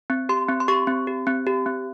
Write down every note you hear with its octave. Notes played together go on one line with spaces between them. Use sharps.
C4
G4 C6
C4
C6
G4 C#6
C4
G4
C4
G4
C4